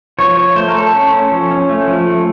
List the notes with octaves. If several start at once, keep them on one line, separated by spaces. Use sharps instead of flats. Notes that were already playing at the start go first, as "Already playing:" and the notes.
F3 C#5
F3 C#5
A3 C5
A#4
A3 A4
C#4
C#4
F3
C#4
A3
F3
A3